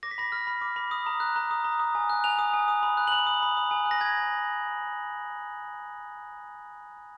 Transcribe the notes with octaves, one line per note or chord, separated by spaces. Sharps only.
D6 A#6
B6
B5 A#6
F6
B5
D6
B5
D#6
A#5
F#6
A#5
D#6
A#5
D#6
G#5
F#6
G#5 F7
D#6
G#5
D#6
B5
F#6
F#7
B5 F7
D#6
B5
D#6
G#5
F#6
A#6
G#5 G#6
D#6